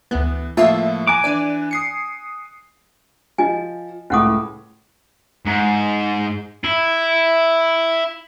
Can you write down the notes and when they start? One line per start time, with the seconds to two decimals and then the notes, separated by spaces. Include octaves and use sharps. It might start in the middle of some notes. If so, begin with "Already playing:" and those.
0.11 D2 E3 B3
0.57 A2 F3 A#3 F4 E5 A5
1.07 G#5 A#5 D6 F#6
1.24 E3 D4 D5 D#7
1.71 D#6 C7 C#7
3.38 F3 D#5 G#5
4.10 C#2 A2 C#4 F#5 D6 D#6
5.45 G#2
6.64 E4